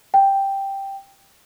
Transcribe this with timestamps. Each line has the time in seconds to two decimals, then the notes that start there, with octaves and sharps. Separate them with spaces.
0.14 G5